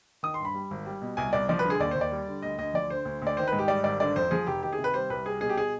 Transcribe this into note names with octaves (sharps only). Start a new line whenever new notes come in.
D#3 D#6
C6
G2
B5
G3
G#1
G3
B2
C2 G#5
C2 D5
F3 D5
B4
D3
G#4
D#2 D5
D#2 C5
D5
G3
D3
D2 D#5
D2 D#5
F3 D5
D3 C5
D2
D2 D5
D#3 C5
B4
G#2
G4
G3 D5
G#1 D5
D3 D5
F2 C5
F3 G#4
F1 G4
D#3 G4
G#4
C3
B4
G3 C5
C2 B4
G3 G#4
B2 G#4
G4
G#4